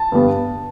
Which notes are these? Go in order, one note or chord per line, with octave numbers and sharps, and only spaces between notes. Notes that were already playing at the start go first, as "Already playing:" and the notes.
Already playing: A5
G2 D3 G3 B3